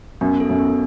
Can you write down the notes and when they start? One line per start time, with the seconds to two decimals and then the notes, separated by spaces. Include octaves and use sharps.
0.21 F#2 B3
0.40 A4
0.49 F#2
0.58 B3